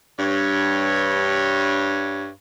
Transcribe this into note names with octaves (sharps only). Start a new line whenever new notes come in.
G2 C#5